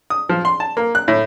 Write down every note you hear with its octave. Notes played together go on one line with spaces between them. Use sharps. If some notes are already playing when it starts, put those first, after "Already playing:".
D#6
F3
C6
A5
A#3
F#6
A2